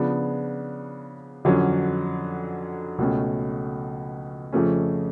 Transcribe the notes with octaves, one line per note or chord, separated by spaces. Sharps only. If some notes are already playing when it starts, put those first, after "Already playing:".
Already playing: C#3 F3 B3 D4
F2 D3 F#3 C#4
C#2 B2 A3 C#4
F2 C#3 F3 A3 C#4